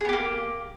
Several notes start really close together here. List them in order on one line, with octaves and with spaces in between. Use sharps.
G#4 B3 G4 A#3